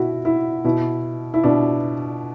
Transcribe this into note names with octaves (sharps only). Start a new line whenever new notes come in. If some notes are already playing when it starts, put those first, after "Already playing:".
Already playing: B2 E4 F#4
E4
B2 E4
E4
B2 D4